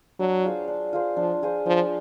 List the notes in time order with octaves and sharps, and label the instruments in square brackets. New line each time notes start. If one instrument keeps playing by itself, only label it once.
[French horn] F#3 [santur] D4
[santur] F4 G#4 C5
D4
F4 G#4 C5
[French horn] F3 [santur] D4
[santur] F4 G#4 C5
[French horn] F3 [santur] D4